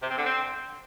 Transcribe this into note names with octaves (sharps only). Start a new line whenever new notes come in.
C3
C4
D3
C4